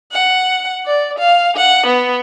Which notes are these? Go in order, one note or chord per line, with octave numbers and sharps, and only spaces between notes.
F#5
D5
F5
F#5
B3